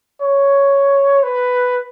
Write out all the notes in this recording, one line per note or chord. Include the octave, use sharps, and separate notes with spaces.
C#5
B4